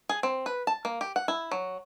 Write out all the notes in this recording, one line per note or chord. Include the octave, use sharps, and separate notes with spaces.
G#4
C4
B4
A5
A#3
G4
F#5
E4
F#3